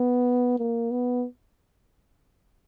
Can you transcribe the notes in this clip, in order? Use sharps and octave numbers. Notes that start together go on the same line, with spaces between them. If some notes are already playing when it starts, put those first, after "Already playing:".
Already playing: B3
A#3
B3